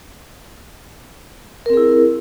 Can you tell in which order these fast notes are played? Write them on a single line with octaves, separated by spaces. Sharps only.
A#4 C4 G#4 E4